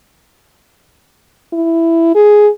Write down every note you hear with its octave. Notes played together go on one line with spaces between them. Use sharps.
E4
G#4